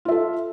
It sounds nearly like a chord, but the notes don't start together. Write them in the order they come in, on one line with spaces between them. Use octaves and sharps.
F4 E5 A4